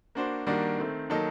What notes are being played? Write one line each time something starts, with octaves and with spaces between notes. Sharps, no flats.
A#3 D4 F#4 C5
D#3 G3 A#3 D4 F#4
D#3 A3 C4
D#3 F#3 A#3 D#4 A4